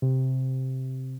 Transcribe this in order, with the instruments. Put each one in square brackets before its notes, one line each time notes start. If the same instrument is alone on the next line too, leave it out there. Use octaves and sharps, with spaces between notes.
[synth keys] C3